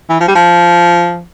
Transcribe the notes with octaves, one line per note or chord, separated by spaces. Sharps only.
E3
F3
G3
F3